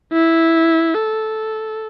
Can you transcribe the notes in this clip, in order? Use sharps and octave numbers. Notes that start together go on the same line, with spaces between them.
E4
A4